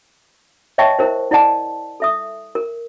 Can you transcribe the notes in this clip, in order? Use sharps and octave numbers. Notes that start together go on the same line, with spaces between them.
C#5 D#5 E5 G5 A5 C#6
E4 A#4 C5
E4 D5 D#5 F#5 A5
A4 E5 D#6
A#4